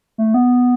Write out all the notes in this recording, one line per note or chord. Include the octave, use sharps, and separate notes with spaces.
A3
B3